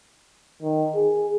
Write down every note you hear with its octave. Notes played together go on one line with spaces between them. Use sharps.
D#3
G#4